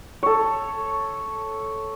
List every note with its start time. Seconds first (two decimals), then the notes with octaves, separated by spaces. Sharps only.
0.23 A4 C#5